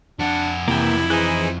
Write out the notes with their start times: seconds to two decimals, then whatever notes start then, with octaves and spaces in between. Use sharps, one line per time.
0.19 F2 D4 F#5
0.68 C3 E3 A#3 E4 G5
1.10 E3 D#4 G#4 C5 F#6